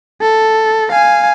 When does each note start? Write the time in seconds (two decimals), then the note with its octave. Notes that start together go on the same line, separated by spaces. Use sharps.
0.21 A4
0.92 F5 G#5